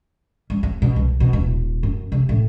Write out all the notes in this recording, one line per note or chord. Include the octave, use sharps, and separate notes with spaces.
G3
C4
B2
C2
B2
D#1
F#2
C3
A2